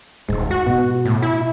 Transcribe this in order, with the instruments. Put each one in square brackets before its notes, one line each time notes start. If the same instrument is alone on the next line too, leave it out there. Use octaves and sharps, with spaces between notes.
[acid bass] D#1 [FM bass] G#2
[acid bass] F#4
[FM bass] B2
[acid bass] A2
E4